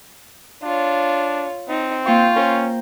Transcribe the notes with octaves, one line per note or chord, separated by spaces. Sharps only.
D4 F4 C#5
C4 D#4
A#3 F4 G5 C#6
C#4 A#4 C5